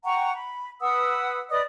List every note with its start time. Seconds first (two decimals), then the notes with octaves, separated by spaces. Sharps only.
0.04 F#5 G5 A#5 C#6
0.34 B5
0.80 B4 F#5 D#6 E6
1.50 B4 D5 D#5 D#6